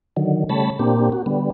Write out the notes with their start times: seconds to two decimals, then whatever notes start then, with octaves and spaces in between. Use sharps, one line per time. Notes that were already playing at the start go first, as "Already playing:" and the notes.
0.17 D3 D#3 F#3
0.49 C#3 G3 A3 C#5 A5 B5
0.79 A#2 A#3 C4 D4 G4
1.12 F#4
1.26 D3 G3 B3